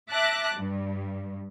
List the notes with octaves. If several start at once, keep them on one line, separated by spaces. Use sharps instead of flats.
E5 A5 D6 F#6 A#6
G2